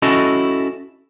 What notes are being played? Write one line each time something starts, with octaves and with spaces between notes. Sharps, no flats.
C#4 E4 F#4 A4 D#5